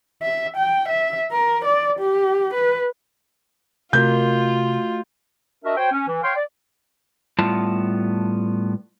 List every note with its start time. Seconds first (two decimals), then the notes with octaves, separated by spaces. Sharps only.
0.22 E5
0.57 G5
0.88 E5
1.32 A#4
1.65 D5
1.99 G4
2.53 B4
3.93 C3 A3 F4 F#4 A#4 G6
5.64 D4 F#4 A#4 D#5 E5
5.77 F#4 C5 C#5 G5
5.92 C#4
6.07 E3
6.22 C#5 F5 G5 C6
6.35 D5
7.39 A2 G3 B3 F4 A5